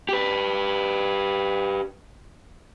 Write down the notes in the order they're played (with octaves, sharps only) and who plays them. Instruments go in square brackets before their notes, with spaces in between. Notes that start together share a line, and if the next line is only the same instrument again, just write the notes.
[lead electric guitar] G4 B4